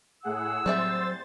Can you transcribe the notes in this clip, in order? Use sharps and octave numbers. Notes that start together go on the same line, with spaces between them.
A2 G#4 F#5 E6
F#3 G3 C4 C5 E5 A6